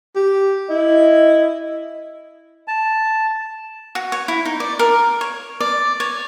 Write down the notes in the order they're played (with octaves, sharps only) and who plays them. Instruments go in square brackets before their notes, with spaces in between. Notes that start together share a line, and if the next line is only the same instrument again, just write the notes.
[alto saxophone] G4
[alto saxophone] E4 [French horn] D#5
[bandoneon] A5
[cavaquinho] F#4
C#5
E4
D#4
D5
A#4
C#5
D5
C#5